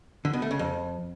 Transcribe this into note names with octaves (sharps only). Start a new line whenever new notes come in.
D3
B2
A3
C#3
F2